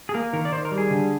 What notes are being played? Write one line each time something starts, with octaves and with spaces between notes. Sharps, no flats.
G#4
A#3 A#4
D#3 A#4
D5
D#3 C5
A#4
G3
G#4
D3